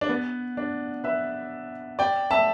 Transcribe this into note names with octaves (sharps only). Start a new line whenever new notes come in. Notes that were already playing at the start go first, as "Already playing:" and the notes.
D4
B3
D4
B4 E5
D5 G5
E5 A5